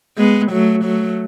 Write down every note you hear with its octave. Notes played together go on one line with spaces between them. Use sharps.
G#3 B3
F#3 A3
F#3 A3